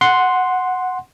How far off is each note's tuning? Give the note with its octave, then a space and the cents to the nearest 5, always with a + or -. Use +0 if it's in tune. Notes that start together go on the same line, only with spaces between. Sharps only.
F#5 -5 C6 +0